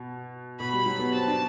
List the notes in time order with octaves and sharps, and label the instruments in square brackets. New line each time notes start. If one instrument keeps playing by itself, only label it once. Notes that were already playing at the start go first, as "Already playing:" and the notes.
Already playing: [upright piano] B2
[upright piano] B2 [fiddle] B5
[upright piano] G3
F#3
B3
[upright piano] C4 [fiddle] A5
[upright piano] D4